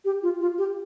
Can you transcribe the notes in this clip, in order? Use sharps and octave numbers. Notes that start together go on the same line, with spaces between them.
G4
F4
F4
G4